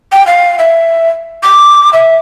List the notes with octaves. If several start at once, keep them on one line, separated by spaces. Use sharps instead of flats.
G5
F5
E5
D6
E5